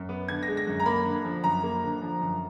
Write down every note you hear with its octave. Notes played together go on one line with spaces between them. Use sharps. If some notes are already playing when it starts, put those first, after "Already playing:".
Already playing: F#2
B3
D3 G#6
A#6
G#3
A#6
F#2
A#5
A#3 B5
D3
F3
F#2 A#5
A#3
D3
F3
F#2